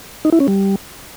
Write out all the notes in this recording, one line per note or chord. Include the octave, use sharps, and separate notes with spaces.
D#4
E4
C#4
G3